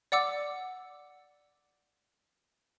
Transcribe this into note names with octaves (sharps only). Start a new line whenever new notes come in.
D5 F#5 D6 E6